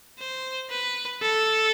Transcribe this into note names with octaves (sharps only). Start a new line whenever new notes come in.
C5
B4
A4